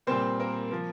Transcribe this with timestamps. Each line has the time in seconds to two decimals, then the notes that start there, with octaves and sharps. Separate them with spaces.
0.07 A#2 G3 A#3 C4 C5
0.40 A#3 A#4
0.71 F3 A#3